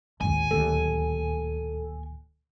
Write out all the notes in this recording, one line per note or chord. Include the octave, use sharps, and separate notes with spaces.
A1 D#2 G#5
D1 D#2 A#2 A4